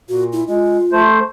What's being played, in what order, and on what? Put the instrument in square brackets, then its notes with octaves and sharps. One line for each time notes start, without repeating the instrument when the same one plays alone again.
[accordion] A#2 [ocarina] F#4
[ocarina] E4
[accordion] G#3 [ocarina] F4
[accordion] A3 C5